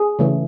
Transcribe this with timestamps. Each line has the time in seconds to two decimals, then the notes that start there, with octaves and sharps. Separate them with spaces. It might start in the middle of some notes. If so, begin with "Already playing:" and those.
Already playing: G#4
0.19 C#3 E3 A3